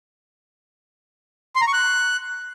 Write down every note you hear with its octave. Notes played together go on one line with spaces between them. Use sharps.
C6
A#5
C#6
F#6